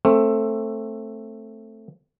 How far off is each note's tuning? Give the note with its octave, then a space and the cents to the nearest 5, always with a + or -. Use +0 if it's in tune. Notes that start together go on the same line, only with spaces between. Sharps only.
A3 +10 C4 +20